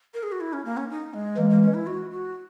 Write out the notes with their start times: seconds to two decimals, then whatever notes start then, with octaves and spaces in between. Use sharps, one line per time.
0.14 A#4
0.23 G#4
0.32 F#4
0.40 E4
0.53 C#4
0.65 A#3
0.77 C#4
0.90 D#4
1.14 G#3
1.37 E3 G#3 A#3
1.50 A#3
1.62 C#4
1.74 E4
1.87 F#4
2.11 F#4